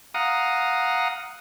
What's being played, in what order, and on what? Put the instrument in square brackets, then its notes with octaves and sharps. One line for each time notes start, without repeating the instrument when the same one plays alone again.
[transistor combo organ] F5 F#5 A#5 D#6